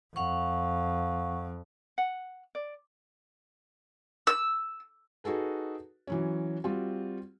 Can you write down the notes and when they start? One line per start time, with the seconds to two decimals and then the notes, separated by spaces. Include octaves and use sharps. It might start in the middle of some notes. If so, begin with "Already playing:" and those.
0.16 F2 F5 F#5 C#6
1.98 F#5
2.55 D5
4.27 E6
5.24 D#4 F#4 G#4 A4 B4
6.07 E3 F#3 C#4
6.64 G3 C4 F4 F#4